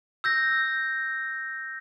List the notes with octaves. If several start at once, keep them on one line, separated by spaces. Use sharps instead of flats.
E6 G6 A#6